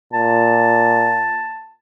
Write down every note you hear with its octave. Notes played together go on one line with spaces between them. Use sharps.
A#2 A5